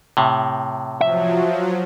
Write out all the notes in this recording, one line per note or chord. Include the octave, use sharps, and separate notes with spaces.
A2 C3
F3 F#3 E5